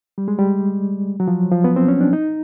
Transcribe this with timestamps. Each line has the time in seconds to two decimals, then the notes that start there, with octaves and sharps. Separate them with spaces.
0.18 G3
0.28 G#3
0.38 G3
1.20 F#3
1.28 F3
1.52 F3
1.64 B3
1.76 C4
1.88 C#4
2.01 D4
2.13 D#4